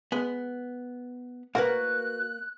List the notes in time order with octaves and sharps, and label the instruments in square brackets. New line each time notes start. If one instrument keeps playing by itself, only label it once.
[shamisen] G#3 [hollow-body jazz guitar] B3
[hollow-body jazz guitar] A#3 [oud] F#4 A#4 B4 [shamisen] F#5 [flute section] F#6